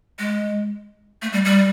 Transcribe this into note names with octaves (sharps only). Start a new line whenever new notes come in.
G#3
A3
G3
G3